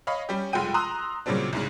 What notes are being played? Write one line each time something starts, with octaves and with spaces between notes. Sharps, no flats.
C#5 D#5 F5 B5
G3 C#4 G4
F1 G#3 F4 F#5 G5 D#7
A#5 C6 D#6 E6 F#6
A#2 C#3 F#3 G3 C4 D4
C2 G#2 C#3